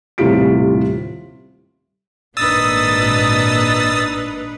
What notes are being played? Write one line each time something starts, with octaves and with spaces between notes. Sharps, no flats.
D#1 A2 C3 F4 B6 D7
G#1 A#2 D4 D#4 B4 D#6 E6 A6